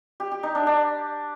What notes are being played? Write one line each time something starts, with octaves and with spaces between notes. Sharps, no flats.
G4
G4
D#4
D4
D4